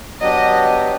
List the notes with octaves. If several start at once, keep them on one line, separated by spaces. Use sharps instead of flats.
F#3 B3 D4 G4 D#5